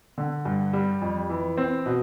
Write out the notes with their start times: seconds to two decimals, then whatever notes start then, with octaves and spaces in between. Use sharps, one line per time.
0.18 D3
0.45 G2
0.73 G3
1.02 F2
1.30 E3
1.57 C4
1.86 B2